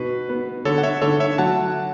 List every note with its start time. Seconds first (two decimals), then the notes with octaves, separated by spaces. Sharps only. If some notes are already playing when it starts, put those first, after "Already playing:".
Already playing: B2 B4
0.29 B3
0.65 D3 A4 C#5
0.78 F#5
0.83 C#5 E5
1.02 D3 A4 C#5
1.20 C#5 E5
1.38 F#3 F#5 A5